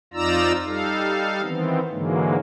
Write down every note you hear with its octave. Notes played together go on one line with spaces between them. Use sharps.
F2 D#4 F4 D5 A#5 E6
G3 D#4 A4 F5
D#3 E3 B3 C4
G#2 D3 E3 F#3 G#3 A#3